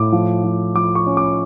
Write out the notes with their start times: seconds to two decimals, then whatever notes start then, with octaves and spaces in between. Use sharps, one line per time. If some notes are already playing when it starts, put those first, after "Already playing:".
Already playing: A2 D6
0.12 F3
0.44 F3
0.75 F3 D6
0.95 C#6
1.07 C#4
1.17 D6